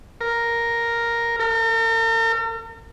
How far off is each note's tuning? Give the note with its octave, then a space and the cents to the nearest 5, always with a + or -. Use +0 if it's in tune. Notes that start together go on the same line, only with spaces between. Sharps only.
A#4 +0
A#4 -45